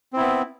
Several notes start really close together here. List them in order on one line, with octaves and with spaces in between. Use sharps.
C4 E4 B3